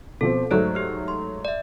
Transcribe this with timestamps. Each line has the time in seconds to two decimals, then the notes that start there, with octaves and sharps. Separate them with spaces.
0.21 B2 F3 C4 A4
0.51 G#2 F#3 A3 C5 D5 F#6
0.75 G4 F6
1.08 C6
1.45 D5 E5